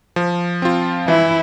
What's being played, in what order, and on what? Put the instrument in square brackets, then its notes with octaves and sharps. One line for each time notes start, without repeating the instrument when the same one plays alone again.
[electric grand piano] F3
C4 F4
[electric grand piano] E3 [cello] E4